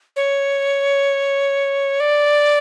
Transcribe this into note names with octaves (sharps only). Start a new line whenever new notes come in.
C#5
D5